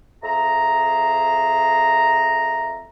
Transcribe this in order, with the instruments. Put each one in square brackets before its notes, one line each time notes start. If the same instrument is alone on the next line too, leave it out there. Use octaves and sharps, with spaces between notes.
[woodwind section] F2 G#4 E5 A#5